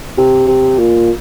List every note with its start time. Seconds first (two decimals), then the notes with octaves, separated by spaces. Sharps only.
0.17 C3
0.47 C3
0.79 A#2